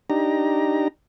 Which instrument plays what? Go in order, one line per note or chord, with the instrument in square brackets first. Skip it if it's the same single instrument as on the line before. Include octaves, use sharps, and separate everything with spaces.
[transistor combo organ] D4 D#4 G4 A#5